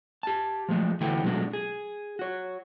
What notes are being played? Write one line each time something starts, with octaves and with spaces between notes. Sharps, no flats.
G4 A5
F3 F#3 G#3 A3
D2 E3 A3 F#4 G5
B2 F#3 G#3 A3 D4 F#4
G#4
F#4 C#5